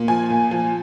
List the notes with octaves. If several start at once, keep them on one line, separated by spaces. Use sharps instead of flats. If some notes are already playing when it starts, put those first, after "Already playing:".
Already playing: A#2
F3 G#5
A#2
F3